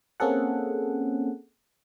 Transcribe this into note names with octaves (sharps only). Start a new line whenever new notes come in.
A#3 C4 C#4 G#4 A4 F#5